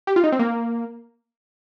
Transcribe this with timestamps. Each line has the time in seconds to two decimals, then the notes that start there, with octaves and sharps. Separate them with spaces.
0.07 G4
0.16 F4
0.24 D#4
0.32 C4
0.39 A#3